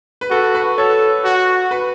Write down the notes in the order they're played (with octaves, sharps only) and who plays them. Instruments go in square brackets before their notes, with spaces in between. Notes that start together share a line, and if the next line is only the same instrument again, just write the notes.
[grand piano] B4
[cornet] F#4 [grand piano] A4
[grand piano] B4
[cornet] A4 [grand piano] C#5
[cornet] F#4
[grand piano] B4